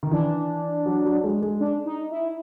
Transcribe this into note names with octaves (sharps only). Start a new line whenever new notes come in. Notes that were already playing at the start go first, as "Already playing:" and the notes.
D#3
E3 D4
F#3
F#3
G#3
G#3
D4
D#4
E4